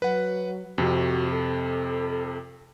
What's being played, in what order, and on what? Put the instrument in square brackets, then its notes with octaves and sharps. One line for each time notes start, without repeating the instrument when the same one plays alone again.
[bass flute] F#3 [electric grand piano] B4 F#5
[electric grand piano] F2 C3 [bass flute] F#4
[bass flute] A4